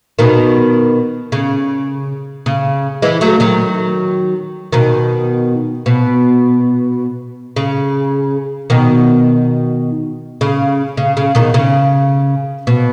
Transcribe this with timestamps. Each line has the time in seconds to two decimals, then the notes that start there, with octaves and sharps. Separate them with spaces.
0.19 B2 D#3
1.32 C#3
2.46 C#3
3.02 E3 G#3
3.21 F#3 A3
3.40 D#3 F#3
4.72 B2 D#3
5.86 B2
7.56 C#3
8.70 B2 D#3
10.41 C#3
10.97 C#3
11.17 C#3
11.35 B2 D#3
11.54 C#3
12.67 B2